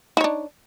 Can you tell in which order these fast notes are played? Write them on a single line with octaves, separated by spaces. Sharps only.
D#4 C#5 D4